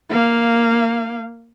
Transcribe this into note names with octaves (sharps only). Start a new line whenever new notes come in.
A#3 F5